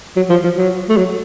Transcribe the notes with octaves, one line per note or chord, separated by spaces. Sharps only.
F#3
F3
F3
F#3
A3
F#3